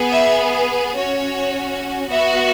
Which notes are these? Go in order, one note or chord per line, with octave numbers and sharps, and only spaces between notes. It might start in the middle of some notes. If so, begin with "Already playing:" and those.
Already playing: B3 G#4
E5
C#4 F#4 C#5
B3 F#4 E5